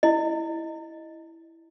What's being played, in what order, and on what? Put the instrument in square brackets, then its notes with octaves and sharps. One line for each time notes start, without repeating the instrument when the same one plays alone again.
[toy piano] E4 D#5